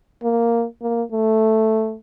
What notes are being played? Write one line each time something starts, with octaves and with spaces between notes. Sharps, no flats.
A#3
A#3
A3